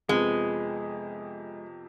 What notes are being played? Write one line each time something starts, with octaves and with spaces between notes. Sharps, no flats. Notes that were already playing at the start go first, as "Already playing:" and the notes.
F2 C3 F3 G#3 B3